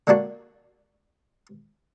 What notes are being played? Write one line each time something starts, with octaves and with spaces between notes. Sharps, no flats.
D3 A#3 D4 F#4